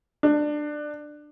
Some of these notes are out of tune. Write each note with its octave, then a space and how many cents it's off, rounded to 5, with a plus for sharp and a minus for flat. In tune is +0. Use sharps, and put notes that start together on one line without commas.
D4 +20